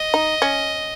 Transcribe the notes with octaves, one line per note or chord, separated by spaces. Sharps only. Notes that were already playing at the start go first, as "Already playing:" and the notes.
Already playing: D#5
D#4
C#4